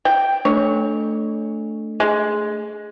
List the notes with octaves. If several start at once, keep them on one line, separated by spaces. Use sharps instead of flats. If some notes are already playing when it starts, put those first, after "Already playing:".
G5
A3 D4 C#5
G#3